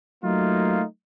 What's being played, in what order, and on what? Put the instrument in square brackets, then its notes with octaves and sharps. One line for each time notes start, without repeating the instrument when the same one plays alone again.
[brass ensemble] F#3 A3 A#3 D#4 F4